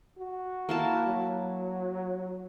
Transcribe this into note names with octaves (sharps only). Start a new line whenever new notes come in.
F#4
A#3 E4 A5
F#3